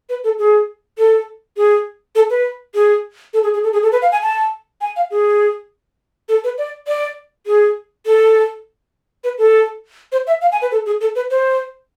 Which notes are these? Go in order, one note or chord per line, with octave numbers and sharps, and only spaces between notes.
B4
A4
G#4
A4
G#4
A4
B4
G#4
A4
G#4
G#4
A4
G#4
A4
B4
F5
G#5
A5
G#5
F5
G#4
A4
B4
D5
D5
G#4
A4
B4
A4
C5
E5
F5
G#5
B4
A4
G#4
A4
B4
C5